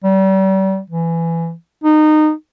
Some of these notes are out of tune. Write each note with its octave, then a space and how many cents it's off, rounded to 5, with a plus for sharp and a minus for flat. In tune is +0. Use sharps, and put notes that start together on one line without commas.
G3 -35
E3 +15
D#4 -20